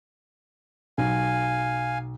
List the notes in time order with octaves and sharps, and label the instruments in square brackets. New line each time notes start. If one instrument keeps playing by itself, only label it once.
[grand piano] B1 [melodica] F5 G#5